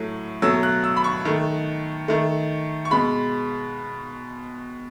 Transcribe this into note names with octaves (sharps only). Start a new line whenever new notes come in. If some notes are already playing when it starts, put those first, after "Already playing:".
Already playing: A2 F#3 A3
B2 F#3 A3 E6
F#6
E6
B5
C#6
D#3 A3
D#3 A3
C#6
B2 G#3 B5